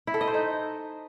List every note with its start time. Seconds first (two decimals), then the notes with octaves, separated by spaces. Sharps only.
0.07 E4
0.14 A4
0.21 D#5
0.27 C5
0.34 D#4